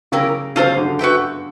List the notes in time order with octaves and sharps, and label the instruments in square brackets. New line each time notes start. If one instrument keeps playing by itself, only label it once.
[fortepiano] C#3 [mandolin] E4 G4 A#4
[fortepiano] C#3 [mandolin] F4 A4 C5 F5
[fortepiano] D3
[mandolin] F#4 B4 E5 G5